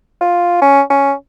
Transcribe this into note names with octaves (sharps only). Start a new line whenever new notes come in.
F4
C#4
C#4